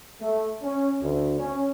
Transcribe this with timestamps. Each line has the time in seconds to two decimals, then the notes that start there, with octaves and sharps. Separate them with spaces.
0.21 A3
0.62 C#4
1.01 D2
1.39 C#4